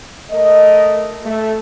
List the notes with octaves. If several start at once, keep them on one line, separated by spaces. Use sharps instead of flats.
A3 A#4 D#5
A3